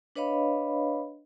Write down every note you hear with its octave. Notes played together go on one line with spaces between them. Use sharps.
D4 B4 C#5 D#5 F5 B5